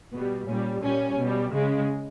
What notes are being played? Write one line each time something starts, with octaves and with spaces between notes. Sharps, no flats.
B2 G3 B3
A#2 G3 C#4
A#2 G3 C#4
B2 G3
C#3 G#3